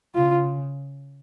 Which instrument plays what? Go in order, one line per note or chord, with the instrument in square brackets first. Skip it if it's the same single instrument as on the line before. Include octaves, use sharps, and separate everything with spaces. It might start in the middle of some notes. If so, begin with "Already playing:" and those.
[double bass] C#3 [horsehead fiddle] F4